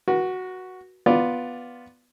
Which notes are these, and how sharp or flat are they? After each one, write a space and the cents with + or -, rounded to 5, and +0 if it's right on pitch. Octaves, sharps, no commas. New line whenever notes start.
F#4 +0 B4 -40
B3 +0 F4 +0 D5 +0